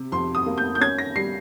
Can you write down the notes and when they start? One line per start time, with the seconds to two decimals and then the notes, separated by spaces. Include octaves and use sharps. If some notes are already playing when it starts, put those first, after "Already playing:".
Already playing: C3
0.12 F2 C6
0.35 D#6
0.46 A#3
0.58 G6
0.75 G6
0.81 C#4 G#6
0.98 A#6
1.16 G3 C7